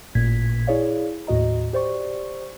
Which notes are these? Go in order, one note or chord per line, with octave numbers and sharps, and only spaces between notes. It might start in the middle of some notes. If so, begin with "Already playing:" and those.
A1 A#2 G#6 B6
E4 G#4 C#5 D5 F5
D#2 A2 F#4 D#5 A#5
G4 C5 D5 C#6